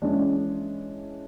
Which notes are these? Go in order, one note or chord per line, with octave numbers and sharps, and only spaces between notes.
E3 G#3 C#4 D4